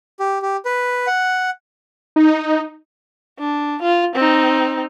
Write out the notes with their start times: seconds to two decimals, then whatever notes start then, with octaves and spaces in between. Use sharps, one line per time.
0.20 G4
0.42 G4
0.65 B4
1.07 F#5
2.16 D#4
3.40 D4
3.82 F4
4.16 C4 D#4